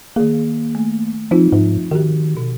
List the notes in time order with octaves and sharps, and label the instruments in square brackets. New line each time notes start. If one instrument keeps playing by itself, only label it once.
[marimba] D#3 G#4 [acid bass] A#3
[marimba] A3
[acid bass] F3 [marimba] C4 D#4 F4
[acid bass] G#2 [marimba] F3
[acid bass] D#3 [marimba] F#4 G4
[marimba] B2